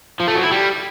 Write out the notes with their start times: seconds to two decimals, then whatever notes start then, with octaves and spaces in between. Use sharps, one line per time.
0.20 F3
0.28 A3
0.36 F#3
0.43 E4
0.51 G3